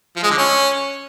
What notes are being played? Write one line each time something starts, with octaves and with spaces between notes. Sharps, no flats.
F3
G#3
D3
C#4